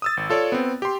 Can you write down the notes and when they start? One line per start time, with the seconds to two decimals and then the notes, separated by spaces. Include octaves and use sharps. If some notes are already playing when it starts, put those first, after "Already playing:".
0.02 D#6 E6 A6
0.17 G#1
0.30 F4 A4 C#5 D5
0.52 B3 C4
0.82 G4 C6